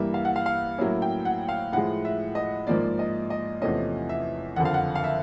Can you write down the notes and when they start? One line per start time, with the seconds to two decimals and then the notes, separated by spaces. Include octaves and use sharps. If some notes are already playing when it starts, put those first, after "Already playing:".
Already playing: G2 E3 G3 A#3 E5
0.14 F5
0.25 F#5
0.36 F5
0.46 F5
0.78 A2 F#3 A#3 C#4 E4
1.02 G5
1.25 F#5
1.49 F5
1.72 A2 F3 G#3 F#5
2.05 E5
2.35 D#5
2.67 G#2 F3 A#3 D5
2.99 D#5
3.30 D#5
3.61 E2 C3 F3 A3 C#4 D#5
4.09 E5
4.56 F#1 F2 D3 F#5
4.65 F5
4.74 F#5
4.95 F5
5.04 E5